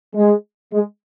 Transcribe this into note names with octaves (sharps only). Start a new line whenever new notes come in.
G#3
G#3